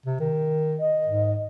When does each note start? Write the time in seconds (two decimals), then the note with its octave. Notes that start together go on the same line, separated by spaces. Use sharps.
0.06 C3
0.20 D#3
0.79 D#5
1.07 G#2